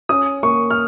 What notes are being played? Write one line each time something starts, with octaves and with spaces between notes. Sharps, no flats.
C#4 D#6
A#3 C#6
F6